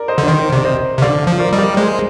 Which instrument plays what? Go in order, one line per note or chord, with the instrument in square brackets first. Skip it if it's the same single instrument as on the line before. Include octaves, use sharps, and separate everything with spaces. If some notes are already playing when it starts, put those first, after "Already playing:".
Already playing: [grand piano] A#4 D5
C5 D#5
[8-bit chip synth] D3
[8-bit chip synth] D#3 [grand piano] C5 D#5
[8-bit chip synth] C3 [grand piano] D5
[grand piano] C5 D#5
[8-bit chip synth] C3
[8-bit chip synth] D3 [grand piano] D5 F5
[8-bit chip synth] F3
[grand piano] A#4 D5
[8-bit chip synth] G3 [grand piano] D#5
[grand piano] A#4 D5
[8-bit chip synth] G#3 [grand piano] G#4 C5